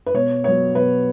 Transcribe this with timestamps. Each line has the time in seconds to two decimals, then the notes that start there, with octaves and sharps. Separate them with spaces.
0.06 B4
0.14 B2 C#5
0.44 F#3 B3 C#5
0.74 B2 B4